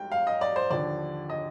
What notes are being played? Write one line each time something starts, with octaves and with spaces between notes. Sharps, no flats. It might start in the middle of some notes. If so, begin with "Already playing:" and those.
Already playing: G#2 G3 G5
F5
D#5
D5
C5
D#2 D3 F3 D5
D#5